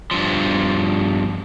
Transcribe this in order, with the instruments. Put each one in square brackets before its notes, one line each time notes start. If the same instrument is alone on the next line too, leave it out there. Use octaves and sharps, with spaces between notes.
[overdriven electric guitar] G2 F3